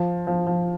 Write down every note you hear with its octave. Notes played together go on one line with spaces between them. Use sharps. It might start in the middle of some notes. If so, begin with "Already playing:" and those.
Already playing: F3
F3
F3